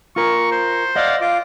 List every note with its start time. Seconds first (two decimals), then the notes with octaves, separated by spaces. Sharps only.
0.16 F4 A#4 C#6
0.52 C5
0.96 D5 D#5 F5 F#5
1.21 F4 D6